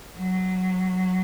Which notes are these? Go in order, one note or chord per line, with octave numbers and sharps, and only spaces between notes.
F#3